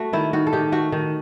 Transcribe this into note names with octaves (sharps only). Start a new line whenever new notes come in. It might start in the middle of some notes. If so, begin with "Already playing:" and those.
Already playing: A3 F#4
D#3 E4
D#3 F#4
A4
D#3 G4
A3 F#4
D#3